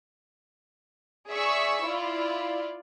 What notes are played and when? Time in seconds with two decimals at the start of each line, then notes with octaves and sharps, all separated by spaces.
1.29 G#4 D5 E5 C#6 E6
1.84 E4 F4 D5